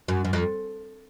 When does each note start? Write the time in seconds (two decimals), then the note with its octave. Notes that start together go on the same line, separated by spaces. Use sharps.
0.08 F#2
0.25 F#2
0.33 F2